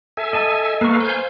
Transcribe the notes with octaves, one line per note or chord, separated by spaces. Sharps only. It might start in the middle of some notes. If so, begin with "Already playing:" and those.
A4 E5 G#5
D#5 A5
A#3 A4 B4 F5 C#6
C5 F5 G#5 G6